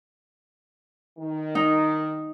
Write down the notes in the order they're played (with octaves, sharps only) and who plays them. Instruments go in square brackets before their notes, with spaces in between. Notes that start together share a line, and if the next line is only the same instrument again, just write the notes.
[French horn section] D#3
[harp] D#4